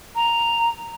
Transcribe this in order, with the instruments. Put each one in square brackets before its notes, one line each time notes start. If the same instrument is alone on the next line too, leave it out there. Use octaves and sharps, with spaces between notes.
[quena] A#5